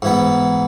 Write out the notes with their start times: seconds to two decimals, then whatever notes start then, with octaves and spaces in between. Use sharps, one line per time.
0.02 G#2 E3 B3